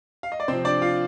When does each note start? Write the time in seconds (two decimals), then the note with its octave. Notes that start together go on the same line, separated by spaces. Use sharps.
0.23 F5
0.32 D#5
0.40 D5
0.48 C3 F3 C4 C5
0.65 D4 D5
0.82 F4 F5